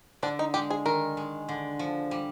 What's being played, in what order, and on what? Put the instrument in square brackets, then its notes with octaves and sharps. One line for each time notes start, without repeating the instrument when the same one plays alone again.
[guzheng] D3 [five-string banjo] D4
[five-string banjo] D#4
[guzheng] G#3 [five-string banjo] G4
[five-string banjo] G#4
[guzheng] D#3 [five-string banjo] A#4
[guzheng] G#3
D3
F3
G3